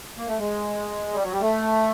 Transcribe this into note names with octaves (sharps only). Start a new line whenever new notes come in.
A#3
A3
G#3
G3
F#3
G3
A3